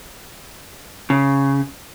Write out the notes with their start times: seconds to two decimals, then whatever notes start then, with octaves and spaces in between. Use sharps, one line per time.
1.10 C#3